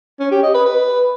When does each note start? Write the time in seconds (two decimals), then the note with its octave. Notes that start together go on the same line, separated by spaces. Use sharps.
0.20 C#4
0.32 G4
0.43 D#5
0.54 B4
0.66 B4